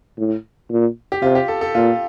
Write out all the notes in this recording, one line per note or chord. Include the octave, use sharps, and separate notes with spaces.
A2
A#2
G4
C3 F4
G4
A4
A4
A#2 F4